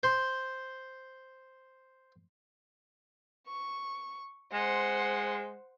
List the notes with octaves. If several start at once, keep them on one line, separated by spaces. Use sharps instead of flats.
C5 C6
C#6
G#3 C5 F#5 C6